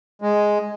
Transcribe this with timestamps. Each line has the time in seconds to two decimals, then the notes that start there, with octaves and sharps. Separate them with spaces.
0.22 G#3